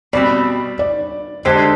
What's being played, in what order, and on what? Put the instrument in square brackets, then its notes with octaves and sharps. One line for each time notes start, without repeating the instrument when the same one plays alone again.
[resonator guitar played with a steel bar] B2 G3 C4 [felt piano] D5
[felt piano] D5
[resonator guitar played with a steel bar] D3 G#3 D4 G4 [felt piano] C5